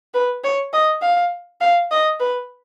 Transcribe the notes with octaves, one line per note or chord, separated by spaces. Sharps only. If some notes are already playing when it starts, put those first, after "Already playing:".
B4
C#5
D#5
F5
F5
D#5
B4